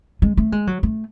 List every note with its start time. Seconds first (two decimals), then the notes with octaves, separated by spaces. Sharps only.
0.22 G#3
0.37 A3
0.52 G#3
0.67 F#3
0.83 A3